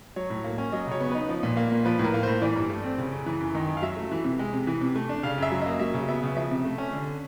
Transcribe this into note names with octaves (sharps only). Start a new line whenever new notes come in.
F#3 C#5
A2
A#3
C#4
F#3 D#5
C#3 C#5
B3
D#4 B4
F3
A#2
A#3
A#2
F3 B4
A2
A#4
A#3
A2 C5
E3 D5
G2
A3
C4
C#3
F#2
E3
F#2
D#3 D#5
F#2
F5
F#3 E5
A3
E3
C3
G#3
C3
E3
C3
A3
D4
C#3 F5
F#2 E5
F#3
A#3 D#5
F#3 E5
C#3
B3 E5
C#3
F3 E5
C3
A3
C#4
D3